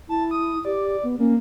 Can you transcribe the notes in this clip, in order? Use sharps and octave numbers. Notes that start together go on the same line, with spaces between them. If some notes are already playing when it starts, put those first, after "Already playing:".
E4 A5
D#6
G4 D5
B3
A#3 C#4